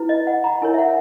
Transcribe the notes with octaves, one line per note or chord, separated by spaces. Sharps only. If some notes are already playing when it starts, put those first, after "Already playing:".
Already playing: E4 B4
D#5
F#5
A#5
E4 A#4 C#5 G#5
E5
F#5